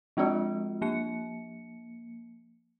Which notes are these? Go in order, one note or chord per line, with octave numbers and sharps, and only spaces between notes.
F3 G#3 C4 F4 F#4
F3 A#3 C#7